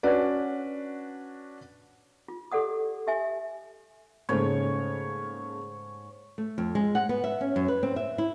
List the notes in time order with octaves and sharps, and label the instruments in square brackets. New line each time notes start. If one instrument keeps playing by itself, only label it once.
[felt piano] C#4 D4 F#4 B4 D5
[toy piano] F4
G4 A4 D5 F#5 D#6
G4 E5 G#5
[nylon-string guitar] G#2 D#4 G#4 [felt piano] C#3 A3 A#3 [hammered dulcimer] C#5
[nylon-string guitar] A3
F2
G#3
F#5
B3
E5
C#4
F#2
B4
C4
E5
E4